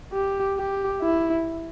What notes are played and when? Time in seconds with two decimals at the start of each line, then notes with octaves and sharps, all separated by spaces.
0.13 G4
0.57 G4
1.02 E4